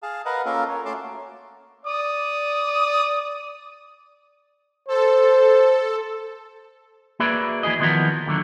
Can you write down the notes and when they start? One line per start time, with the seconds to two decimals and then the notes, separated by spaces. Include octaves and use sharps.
0.03 G#4 F5 A5
0.25 A#4 B4 D#5 F5 F#5
0.45 A#3 C#4 F4 A4 A#4
0.69 A#3 C#5
0.85 A3 C#4 F#4 A5 C6 D6
1.85 D5 D#6
4.88 A4 C5
7.20 A#3 F#4 G#4 B4 D5 E5
7.63 E3 A#3 E4 G#4 D#5
7.80 D#3 F3 B3 E4 F#4 A#4
8.26 D#2 D3 F#3